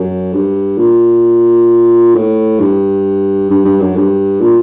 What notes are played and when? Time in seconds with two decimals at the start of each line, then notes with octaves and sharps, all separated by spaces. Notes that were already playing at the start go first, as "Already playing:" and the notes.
Already playing: F#2
0.33 G2
0.78 A#2
2.15 A2
2.60 G2
3.50 G2
3.65 G2
3.81 F#2
3.96 G2
4.41 A#2